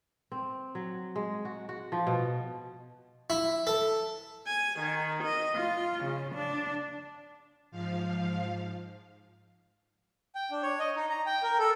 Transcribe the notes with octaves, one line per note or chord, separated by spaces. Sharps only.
C4
F#3
G#3
F#4
F#4
F3
B2
E4
A4
G#5
D#3
D#5
F4
C#3
D4
G#2 F3 F5
G5
D4
C#5
D#5
D#4
A#5
G5
A#4
A4